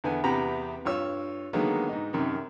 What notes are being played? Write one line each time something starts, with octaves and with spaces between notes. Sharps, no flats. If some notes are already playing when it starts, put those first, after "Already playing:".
E2 D3 B3 G#5
E2 C3 B3 G4 A#5 B5
G2 F4 C#5 E6
D3 D#3 F#3 G#3 A#3 B3
G#2 D#4
F#2 C3 D#3